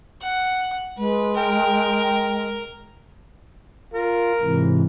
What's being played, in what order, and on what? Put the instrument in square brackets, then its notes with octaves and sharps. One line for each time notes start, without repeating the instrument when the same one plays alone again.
[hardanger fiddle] F#5
[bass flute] G#3 [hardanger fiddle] B4
[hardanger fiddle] A#4 [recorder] G5
[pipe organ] F4 [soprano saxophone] A#4
[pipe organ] G#2 C3 E3